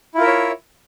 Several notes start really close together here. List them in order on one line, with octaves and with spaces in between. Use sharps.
E4 F4 A#4 E5 C#5